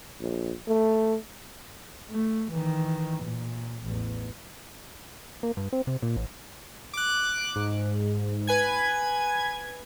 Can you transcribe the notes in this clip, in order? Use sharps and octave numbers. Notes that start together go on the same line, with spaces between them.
A#1
A3
A3
D#3 E3
A#2
A1 E2
A#3
G2
C4
C3
A#2
A1
D6 F#6
G#2
B4 G#5 G#6